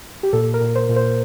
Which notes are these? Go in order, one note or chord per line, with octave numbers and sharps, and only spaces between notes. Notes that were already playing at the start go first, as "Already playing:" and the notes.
G4
A#2 A4
A#4
A#2
C5
A#2
C5